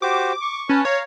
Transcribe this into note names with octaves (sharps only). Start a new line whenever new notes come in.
F#4 G4 C5 D6
C#6
C#4 B4 C#5 A5
C#5 F5 A#5